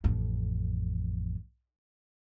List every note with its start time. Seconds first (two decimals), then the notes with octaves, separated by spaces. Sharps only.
0.04 A1 F2